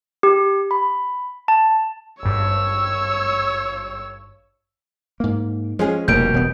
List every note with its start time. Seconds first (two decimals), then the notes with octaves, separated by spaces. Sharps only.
0.23 G4
0.71 B5
1.48 A5
2.23 G#1 G2 C#5 E6
5.20 G#2 A#3
5.79 F3 G#3 C#4 G#4
6.08 F1 B2 G3 A#3 G6 D7
6.34 E1 B3